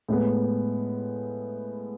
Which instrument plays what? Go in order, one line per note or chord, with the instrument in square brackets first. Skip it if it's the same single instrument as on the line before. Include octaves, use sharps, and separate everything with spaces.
[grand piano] A2 G#3 B3